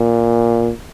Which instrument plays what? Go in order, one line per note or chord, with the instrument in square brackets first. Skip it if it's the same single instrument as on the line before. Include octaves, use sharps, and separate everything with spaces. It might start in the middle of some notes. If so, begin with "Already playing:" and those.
Already playing: [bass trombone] A#2